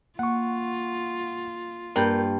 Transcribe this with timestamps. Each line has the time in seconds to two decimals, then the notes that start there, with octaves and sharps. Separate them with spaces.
0.19 A#3 F4 F#5 C#6
1.96 G2 A#3 A#4 G6